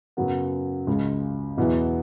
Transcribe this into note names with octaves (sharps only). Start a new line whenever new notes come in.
F#2 C#3 F#3 B3
C#2 C#3 G#3
E2 B2 F#3 B3 E4